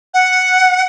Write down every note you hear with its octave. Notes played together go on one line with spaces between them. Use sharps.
F#5